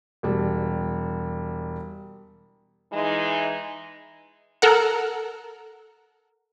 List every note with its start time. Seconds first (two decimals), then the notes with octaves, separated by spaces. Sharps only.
0.23 E1 G3
2.93 E3 G#3 D#4
4.62 A4 A#4 F#5